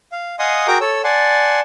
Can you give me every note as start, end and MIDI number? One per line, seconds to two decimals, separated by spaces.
0.12 0.36 77
0.39 0.67 75
0.39 0.67 77
0.39 0.67 78
0.39 0.67 80
0.39 0.67 84
0.39 0.67 87
0.68 0.78 66
0.68 0.78 68
0.68 0.78 70
0.68 0.78 79
0.68 0.78 82
0.68 0.78 86
0.81 1.02 69
0.81 1.02 73
0.81 1.02 88
1.04 1.60 74
1.04 1.60 78
1.04 1.60 80
1.04 1.60 81
1.04 1.60 84